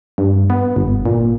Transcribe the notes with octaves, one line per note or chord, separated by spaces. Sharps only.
G2
B3
G1
A#2